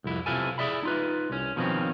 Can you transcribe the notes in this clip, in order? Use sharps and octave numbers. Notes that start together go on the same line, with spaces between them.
C2 F2 E4
B1 C3 E4 F4 A4 G#5
E4 G#4 D5 E5 B5
D#4 F4 B4
C2 C#4
B2 D#3 F3 A3 C4 C#4